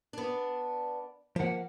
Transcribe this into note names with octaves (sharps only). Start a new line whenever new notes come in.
B3 D4
F3 A#3 F#5